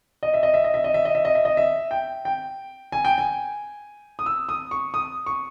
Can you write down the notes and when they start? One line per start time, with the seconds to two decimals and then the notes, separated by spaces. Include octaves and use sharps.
0.23 D#5
0.34 E5
0.43 D#5
0.54 E5
0.64 D#5
0.74 E5
0.84 D#5
0.94 E5
1.05 D#5
1.15 E5
1.25 D#5
1.35 E5
1.45 D#5
1.57 E5
1.91 G5
2.25 G5
2.92 G#5
3.05 G5
3.18 G#5
4.19 D#6
4.26 E6
4.49 D#6
4.71 C#6
4.94 D#6
5.26 C#6